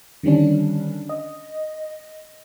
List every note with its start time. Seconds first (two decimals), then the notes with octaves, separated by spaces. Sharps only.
0.23 D3 D#3 G3 C#4 D4
1.09 D#5